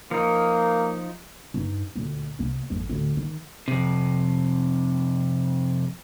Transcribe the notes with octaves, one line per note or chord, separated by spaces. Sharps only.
F3 A#3 D#4
G2 D#4
D2 A#2
C2 A#3
G#1 F2
D2 A2
D#3
F2 C3